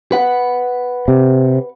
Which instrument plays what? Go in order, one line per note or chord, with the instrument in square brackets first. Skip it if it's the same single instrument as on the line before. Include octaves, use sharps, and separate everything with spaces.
[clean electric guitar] B4 F#5
[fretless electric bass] C3